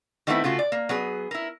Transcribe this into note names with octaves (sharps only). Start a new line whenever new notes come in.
D#3 G3 A3 B3 C4 E4
C#3 A3 F4 F#4
D5
A#3
F#3 B3 G#4
E4 A#4